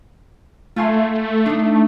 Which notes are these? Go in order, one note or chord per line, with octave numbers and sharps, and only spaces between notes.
A3 F4 G#5 C6
D4 D#4